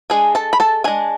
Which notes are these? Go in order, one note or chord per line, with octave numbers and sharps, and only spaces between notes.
G#3 D4 G#4 G#5
A4 A5
B5
A4 A5
G#3 D4 G#4 G#5